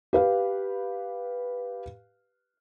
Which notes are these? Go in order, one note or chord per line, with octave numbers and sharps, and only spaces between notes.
G4 B4 F5